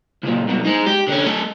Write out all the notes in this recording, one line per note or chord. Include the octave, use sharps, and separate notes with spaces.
C#2 A#2
C2 B2
G#3 D#4
G4
D3 C#4
A3 D#5